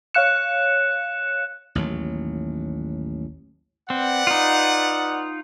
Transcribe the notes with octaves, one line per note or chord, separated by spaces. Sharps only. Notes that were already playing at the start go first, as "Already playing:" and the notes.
C#5 F5 F#6 C#7 E7
A1 D#2 F#3
C4 B4 D5 F#5
D#4 F4